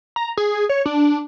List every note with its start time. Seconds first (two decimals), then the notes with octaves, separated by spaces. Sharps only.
0.16 A#5
0.37 G#4
0.69 C#5
0.86 D4